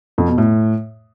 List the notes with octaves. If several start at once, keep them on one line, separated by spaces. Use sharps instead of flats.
F2
B2
A2